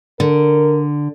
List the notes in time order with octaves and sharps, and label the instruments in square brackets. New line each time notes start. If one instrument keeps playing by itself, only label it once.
[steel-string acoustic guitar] D3 [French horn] A#4